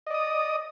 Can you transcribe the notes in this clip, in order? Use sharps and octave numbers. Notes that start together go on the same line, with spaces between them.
D5 D#5 D#6